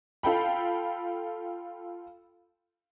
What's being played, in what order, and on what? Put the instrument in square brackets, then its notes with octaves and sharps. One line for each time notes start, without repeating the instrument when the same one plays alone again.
[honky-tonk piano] F4 A4 G5 B5